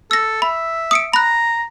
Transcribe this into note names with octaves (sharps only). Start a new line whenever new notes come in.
A4 E6 A#6
E5 B5
D#6 C#7 D7
A#5 B5 F#6